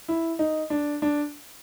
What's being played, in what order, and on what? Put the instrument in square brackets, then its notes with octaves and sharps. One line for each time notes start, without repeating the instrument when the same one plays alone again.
[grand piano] E4
D#4
D4
D4